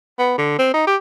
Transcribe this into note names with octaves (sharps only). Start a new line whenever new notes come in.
B3
D3
C4
D#4
G4